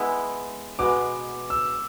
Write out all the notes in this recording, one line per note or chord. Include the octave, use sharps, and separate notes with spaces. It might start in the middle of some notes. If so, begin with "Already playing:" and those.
Already playing: G#3 B3 E4
B2 G#3 B3 D6
E6